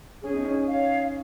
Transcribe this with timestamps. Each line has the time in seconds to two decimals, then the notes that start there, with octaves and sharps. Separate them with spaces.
0.23 C#4 G#4
0.34 D#4
0.45 C#4
0.68 C#5 F5